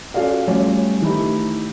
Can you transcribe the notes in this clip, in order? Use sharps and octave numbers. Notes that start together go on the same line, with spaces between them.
C#4 F4 F#4 A4 D5 F5
G3 A3 C#4 F4 C#5
D#3 E3 A3 D#4 E4 G4